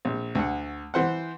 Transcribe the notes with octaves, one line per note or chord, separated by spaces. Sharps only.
A#1
D2 F#5
E3 C5 F#5